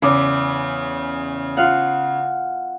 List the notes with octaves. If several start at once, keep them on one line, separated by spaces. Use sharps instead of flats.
E2 C#3 D6
F4 F5 F#5